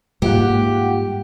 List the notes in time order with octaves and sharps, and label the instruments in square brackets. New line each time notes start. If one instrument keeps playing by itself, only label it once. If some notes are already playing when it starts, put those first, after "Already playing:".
[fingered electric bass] G#2 G3 A#3 [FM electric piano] G#3 F4 F#5 [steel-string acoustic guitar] G4